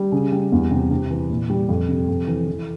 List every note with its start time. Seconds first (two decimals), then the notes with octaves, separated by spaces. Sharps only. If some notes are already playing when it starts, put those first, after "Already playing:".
Already playing: G3
0.12 C#3
0.32 G3
0.52 E2
0.71 C3
0.91 C3
1.10 E3
1.30 A#2
1.50 G3
1.69 F2
1.88 C3
2.08 F2
2.27 E3
2.47 E3